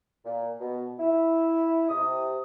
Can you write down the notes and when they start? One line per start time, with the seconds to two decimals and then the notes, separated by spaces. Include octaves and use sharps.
0.25 A#2
0.60 B2
0.99 E4
1.89 C3 D#6